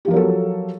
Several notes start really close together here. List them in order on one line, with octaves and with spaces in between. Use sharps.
G4 F3 A#4 F#3 A4